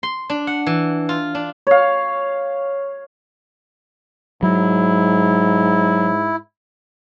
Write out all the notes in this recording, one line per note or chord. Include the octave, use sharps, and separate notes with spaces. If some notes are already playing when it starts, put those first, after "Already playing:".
C6
D4
F#5
E3
F4
D4
C#5 F5
G#2 F#3 E4